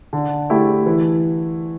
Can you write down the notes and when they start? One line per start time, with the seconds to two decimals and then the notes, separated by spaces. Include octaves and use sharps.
0.13 D3
0.50 A3 E4 G4
0.86 E3